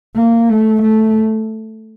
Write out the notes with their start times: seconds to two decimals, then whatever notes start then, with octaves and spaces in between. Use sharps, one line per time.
0.15 A#3
0.49 A3
0.82 A3